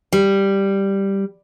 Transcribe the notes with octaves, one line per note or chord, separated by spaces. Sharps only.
G3